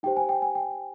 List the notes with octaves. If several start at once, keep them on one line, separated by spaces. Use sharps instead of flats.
D#4 G4 C5 G5
G#5
G5
G#5
G5